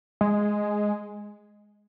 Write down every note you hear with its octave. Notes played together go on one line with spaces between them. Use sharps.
G#3